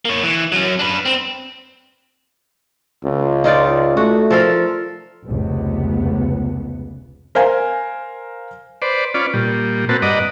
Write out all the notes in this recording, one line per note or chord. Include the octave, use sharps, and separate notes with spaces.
A#3 C#5
E3
F#3 C#4
D4 B4
C4
C#2
D#4 F4 D5
A3 F#4
F3 A4 A#4
F1 C#2 B3
A#4 C5 F5 G#5
B4 C5 D5
C#4 F4 B4 D5
A#2 G3
A#3 C4 F#4 B4 A5
G2 B4 D5 D#5 F#5 A#5